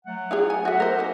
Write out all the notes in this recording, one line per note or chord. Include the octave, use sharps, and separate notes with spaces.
F#3 A3 F#5
E4 F4 G#4
G#5
A3 F#4 E5 F#5
A#4 C5
A#3 D#4